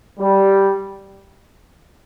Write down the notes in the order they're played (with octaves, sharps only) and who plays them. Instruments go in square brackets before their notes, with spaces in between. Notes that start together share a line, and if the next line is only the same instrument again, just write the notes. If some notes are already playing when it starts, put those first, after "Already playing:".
[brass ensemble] G3